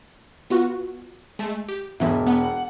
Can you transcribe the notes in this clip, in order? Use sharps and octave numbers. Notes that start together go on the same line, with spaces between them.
B3 F4 F#4
G#3 A3
G4
E1 G#2 B2 E3 E5 B6
B3 F#5